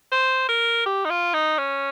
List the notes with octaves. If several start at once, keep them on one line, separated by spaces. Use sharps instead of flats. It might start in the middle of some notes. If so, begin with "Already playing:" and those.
C5
A#4
G4
D#4
F4
D#4
C#4